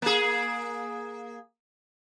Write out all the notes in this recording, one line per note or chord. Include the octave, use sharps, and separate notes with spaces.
A#3 G#4